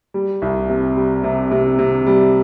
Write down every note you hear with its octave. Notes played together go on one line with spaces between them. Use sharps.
G3
C2
C3
G3
C3
C3
C3
G3